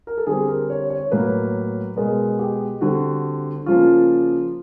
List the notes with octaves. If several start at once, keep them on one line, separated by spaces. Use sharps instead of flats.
A#4
A4
D3 G3 C4 G#4
A#4
C#5
C#5
A2 F#3 A#3 B4
B2 G#3 B3 A#4
G4
D3 G3 C4 F#4
C#3 F3 A#3 F4